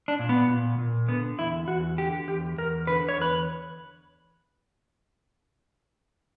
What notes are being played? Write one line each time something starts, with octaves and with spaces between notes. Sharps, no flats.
D4
A#2
B3
A#2
A#2
D3 B3
E2 E4
E2 F#4
D3 G4
E2 G4
E2 A#4
D3 B4
C#5
E2 B4